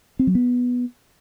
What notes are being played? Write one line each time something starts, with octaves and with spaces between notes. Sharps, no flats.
C4
F#3
B3